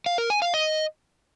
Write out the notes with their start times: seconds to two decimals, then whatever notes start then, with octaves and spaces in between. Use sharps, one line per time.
0.06 F5
0.18 A#4
0.30 G#5
0.42 F5
0.54 D#5